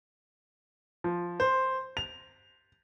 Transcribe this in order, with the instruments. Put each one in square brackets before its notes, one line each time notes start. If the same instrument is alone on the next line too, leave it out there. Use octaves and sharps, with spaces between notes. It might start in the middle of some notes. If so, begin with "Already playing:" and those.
[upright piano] F3
C5
F7